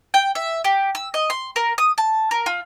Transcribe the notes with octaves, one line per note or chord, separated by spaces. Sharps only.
G5
E5
G4
E6
D#5
C6
A#4
D#6
A5
A#4
F4